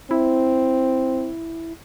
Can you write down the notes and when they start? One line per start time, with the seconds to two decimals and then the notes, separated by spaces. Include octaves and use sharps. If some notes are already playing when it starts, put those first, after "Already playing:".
0.11 C4 E4